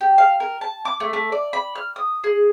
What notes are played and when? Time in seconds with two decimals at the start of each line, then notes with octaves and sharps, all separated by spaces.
0.01 G4
0.18 F5
0.40 A#4
0.61 A5
0.85 D6
1.00 A3
1.13 A3
1.32 D5
1.53 B5
1.76 F6
1.96 D#6
2.24 G#4